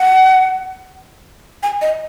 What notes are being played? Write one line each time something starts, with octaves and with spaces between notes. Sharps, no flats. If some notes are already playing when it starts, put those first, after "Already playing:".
Already playing: F#5
G#5
D#5